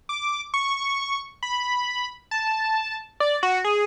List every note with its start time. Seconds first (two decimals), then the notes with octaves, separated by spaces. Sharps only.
0.09 D6
0.54 C#6
1.43 B5
2.31 A5
3.20 D5
3.43 F#4
3.64 G#4